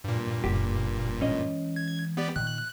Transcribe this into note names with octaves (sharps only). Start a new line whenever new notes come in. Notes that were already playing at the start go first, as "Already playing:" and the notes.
G2 A#2
F#1 G4
E3 G#3 C#4 D#5
G#6
B3 G4 D5
A#2 D#3 F#6